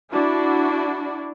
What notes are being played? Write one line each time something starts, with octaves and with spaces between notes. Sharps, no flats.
D4 E4 F#4